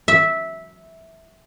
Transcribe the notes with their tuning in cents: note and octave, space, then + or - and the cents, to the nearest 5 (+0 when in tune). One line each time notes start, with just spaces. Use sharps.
E5 -10